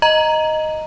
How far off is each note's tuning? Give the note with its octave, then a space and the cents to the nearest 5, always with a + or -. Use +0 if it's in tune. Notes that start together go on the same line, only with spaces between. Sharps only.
D#5 +0 A#5 +0